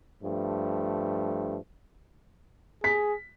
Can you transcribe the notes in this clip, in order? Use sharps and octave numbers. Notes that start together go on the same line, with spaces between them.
G2 F3 A3
G#4 B6